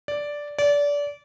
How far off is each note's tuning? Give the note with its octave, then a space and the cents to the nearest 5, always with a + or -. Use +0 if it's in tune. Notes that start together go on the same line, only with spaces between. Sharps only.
D5 -5
D5 -25